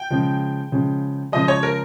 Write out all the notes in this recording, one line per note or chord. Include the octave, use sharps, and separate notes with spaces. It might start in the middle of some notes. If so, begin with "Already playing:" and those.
Already playing: G5
C#3 F3 G#3
C#3 F3 G#3
C#3 F3 G#3 D#5
C#5
A#4